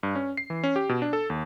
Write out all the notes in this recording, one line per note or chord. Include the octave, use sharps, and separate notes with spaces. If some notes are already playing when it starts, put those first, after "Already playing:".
G2
C#4
C7
E3
C#4
G4
B2
D4
A4
D#2